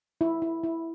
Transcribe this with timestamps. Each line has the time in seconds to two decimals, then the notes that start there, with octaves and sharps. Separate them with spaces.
0.21 E4
0.42 E4
0.64 E4